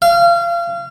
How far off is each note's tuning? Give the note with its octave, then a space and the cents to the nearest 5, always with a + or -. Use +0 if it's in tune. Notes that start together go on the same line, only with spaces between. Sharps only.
F5 -30